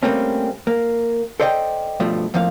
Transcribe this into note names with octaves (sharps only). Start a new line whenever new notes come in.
G3 A3 A#3 C4 C#4
A#3
A4 C5 D5 D#5 F#5 G5
G2 B2 F3 A3
F2 A2 F3 A#3 F5